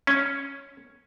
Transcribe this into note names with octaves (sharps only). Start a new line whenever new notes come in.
C#4